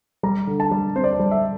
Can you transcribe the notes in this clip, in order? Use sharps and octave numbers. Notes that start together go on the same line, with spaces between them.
G3 A#5
D3
A5
G3
C4 C5
D5
C5
G3
E5